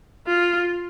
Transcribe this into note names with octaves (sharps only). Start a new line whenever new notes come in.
F4